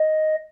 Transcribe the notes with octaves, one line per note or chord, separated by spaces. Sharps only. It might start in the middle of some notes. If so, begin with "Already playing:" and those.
Already playing: D#5